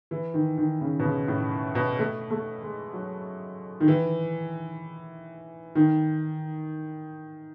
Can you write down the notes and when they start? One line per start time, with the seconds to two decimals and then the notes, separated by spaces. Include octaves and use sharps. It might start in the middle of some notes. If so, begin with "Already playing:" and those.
0.11 E3
0.34 D#3
0.58 D#3
0.81 C#3
0.99 B2
1.05 C#3
1.28 A2
1.75 B2
1.99 A3
2.30 A3
2.62 G#3
2.93 F#3
3.80 D#3
3.88 E3
5.75 D#3